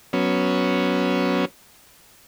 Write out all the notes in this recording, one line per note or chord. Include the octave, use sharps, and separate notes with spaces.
F#3 B3 C#4